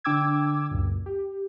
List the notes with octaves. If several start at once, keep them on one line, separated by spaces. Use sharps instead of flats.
D3 D4 G5 D6 E6 G#6
C#2 F#2 A#2
G4